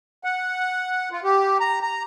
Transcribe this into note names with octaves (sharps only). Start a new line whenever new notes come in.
F#5
F4
G4
A#5
A#5